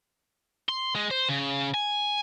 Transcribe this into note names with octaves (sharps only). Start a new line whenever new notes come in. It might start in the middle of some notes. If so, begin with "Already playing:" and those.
C6
G#3
C5
C#3
G#5